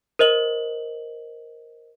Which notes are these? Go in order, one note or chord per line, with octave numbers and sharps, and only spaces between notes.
A#4 C5 D#5 F#7